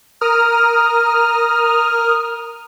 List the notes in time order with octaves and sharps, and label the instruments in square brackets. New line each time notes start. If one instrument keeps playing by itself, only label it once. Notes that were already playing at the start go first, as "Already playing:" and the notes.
[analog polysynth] A#4 D#6 F6